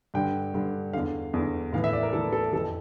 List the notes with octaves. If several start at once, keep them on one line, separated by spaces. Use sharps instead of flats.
G2 D3 G5
G2 D3
E2 D3 F5
E2 D3
A2 E3 F5
E5
D5
A#4
A2 E3 A4
A4
F2 E3 A4